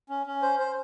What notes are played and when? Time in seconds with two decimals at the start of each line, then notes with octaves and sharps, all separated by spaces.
0.09 C#4
0.27 C#4
0.42 C5
0.59 C5